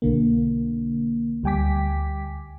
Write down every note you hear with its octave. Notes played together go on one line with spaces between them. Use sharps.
B1 D3 A#3
D2 G3 G5 G#5 D6 B6